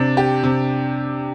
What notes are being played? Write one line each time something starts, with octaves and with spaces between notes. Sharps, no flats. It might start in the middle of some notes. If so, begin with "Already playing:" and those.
Already playing: C3 D4
G4
C3